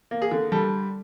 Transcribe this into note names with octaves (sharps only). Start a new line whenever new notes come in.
A#3
G#4
D3
G3 A4